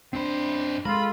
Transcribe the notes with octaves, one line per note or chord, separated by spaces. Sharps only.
F#2 C4 D4 C5 B5
G#3 F4 A4 A#4 B5